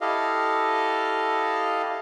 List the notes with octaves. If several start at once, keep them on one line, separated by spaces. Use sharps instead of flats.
E4 G4 A4 D#5 F5